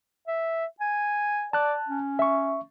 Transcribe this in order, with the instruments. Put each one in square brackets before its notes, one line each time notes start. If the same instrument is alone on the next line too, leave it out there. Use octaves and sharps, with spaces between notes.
[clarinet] E5
G#5
[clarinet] D5 [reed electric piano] A5 F#6
[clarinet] C#4
[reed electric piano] E5 C#6